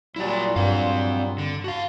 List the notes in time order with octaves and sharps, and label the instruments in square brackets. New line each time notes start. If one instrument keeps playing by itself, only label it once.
[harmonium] A#2 F#3 G3 [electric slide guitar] E4 D5
[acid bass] G2 [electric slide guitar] C4 F5
[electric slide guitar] D3
[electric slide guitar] F#4 F5 [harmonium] A5